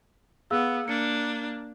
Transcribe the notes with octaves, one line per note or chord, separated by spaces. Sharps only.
B3 G#4 F5 E6
A#3 D4 C#7